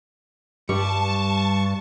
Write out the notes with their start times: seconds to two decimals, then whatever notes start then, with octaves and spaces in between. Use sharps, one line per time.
0.69 G2 G3 A5 C#6